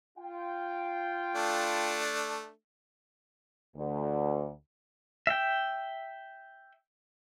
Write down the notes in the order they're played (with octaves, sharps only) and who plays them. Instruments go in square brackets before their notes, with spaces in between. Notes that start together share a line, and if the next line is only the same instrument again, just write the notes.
[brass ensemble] F4 G5
[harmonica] A3 D4
[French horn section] D2
[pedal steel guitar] E5 G5